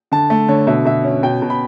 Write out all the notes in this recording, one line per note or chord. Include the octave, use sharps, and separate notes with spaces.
D3 A5
A3
D3 C#5
B2 E5
B2 E5
C#4
B2 G5
B2
B5